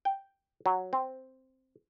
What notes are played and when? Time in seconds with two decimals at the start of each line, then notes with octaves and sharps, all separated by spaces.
0.05 G5
0.66 F#3
0.93 C4